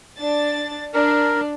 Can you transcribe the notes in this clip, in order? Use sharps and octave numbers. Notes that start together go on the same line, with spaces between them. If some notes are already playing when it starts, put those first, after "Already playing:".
D4 A6
D4 A#4